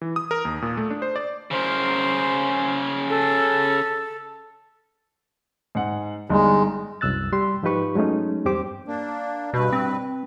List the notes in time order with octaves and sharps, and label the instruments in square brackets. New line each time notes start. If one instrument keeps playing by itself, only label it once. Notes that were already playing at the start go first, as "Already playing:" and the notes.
[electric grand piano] E3
D#6
A#4
D#2
A#2
A3
D4
C5
D5
[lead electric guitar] C#3 A#4 [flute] C5
[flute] A4
[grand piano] G#2 F#5
[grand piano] G1 G3 D#4 [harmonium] G#3
[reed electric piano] C2 F#2 E6 F#6 A6
G3 G4 C6
G#2 F3 D#4 G4 B4 C#6
F#3 G#3 A3 C#4 D#4
E2 G2 C4 G4 C5 D6
[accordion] A#3 D4
[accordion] G2 B4 [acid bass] B2
[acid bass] C4